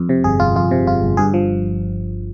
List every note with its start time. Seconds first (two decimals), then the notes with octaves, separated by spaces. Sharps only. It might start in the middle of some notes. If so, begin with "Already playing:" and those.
Already playing: F2
0.09 C3
0.24 G1 G#4
0.40 G1 F4
0.55 F2 F4
0.71 C3
0.86 G1 F4
1.02 G1
1.17 G2 G#4
1.34 F3